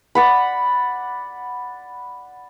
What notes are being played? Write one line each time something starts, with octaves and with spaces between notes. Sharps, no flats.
D5 F#5 B5